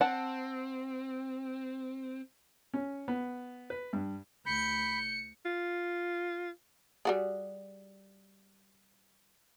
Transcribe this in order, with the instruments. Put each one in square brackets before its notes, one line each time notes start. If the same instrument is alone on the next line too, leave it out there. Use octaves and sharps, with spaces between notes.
[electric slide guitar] C4 [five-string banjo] F#5 A5
[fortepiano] C#4
B3
B4
G2
[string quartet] D2 G6 [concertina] B5 [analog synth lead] C#7
[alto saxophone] F4
[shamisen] G3 F#4 G#4